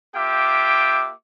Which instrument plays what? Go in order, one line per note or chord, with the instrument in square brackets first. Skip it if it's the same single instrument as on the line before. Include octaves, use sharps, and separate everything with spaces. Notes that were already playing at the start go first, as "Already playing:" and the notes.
[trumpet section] A#3 F4 G4 E5 G5 D6